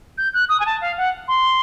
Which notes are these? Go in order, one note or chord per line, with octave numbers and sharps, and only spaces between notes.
G6
F#6
D#6
G#5
A5
F5
F#5
C6